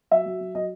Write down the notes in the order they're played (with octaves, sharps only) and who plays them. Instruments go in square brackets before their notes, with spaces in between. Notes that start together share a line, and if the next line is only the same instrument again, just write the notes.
[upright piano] F#3 E5
F#3
F#3
F#3 D#5